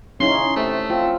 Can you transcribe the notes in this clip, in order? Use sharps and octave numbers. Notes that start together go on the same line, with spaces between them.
C#3 C#4 D#4 E4 C6
C3 A3
C4 F4